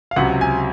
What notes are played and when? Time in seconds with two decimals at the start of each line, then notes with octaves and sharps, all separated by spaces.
0.11 F5
0.16 C#2 C3 F#3 F#5
0.41 G#5